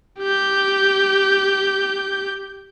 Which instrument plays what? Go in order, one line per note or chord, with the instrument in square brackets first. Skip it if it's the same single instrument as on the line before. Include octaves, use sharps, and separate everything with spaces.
[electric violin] G4 G6